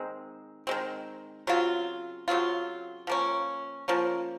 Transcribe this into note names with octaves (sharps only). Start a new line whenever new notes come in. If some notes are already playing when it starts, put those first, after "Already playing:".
Already playing: D#3 G#3 C4
D#3 G#3 C4
C#3 F#3 C4 F4
C#3 F#3 C4 F4
F3 A#3 C#4
F3 A#3 C#4